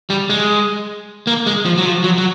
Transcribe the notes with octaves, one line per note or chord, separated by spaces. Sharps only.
G3
G#3
A#3
G#3
F3
F#3
F3
F#3
F#3